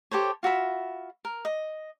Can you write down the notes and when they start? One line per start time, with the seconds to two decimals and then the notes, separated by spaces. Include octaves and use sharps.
0.11 G4 A4 C5 C#5
0.43 F4 F#4 E5 B5
1.25 A#4
1.45 D#5